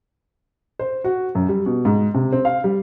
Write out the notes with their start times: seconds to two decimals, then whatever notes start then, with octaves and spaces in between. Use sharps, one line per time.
0.79 C5
1.04 F#4
1.35 F#2
1.49 G3
1.66 B2
1.85 G#2
2.15 C3
2.32 C4
2.45 F5
2.64 G3